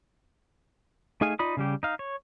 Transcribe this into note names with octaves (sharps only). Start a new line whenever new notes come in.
A3 D#4 G#4 F5 G#5
D#4 F4 D5 B5 D#6
C#3 G3 G4
D#4 F5
C#5